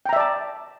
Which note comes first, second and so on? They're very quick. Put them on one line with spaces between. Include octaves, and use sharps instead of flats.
G5 A#5 E5 D5 A5